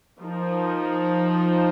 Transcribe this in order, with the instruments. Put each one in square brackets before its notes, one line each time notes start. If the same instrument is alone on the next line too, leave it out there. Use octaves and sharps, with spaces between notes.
[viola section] F3 D#4 A#4